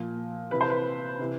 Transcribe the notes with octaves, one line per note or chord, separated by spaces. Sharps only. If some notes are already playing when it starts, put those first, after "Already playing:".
Already playing: A#2 F3
C3 E3 B4
C5
B4
C3 E3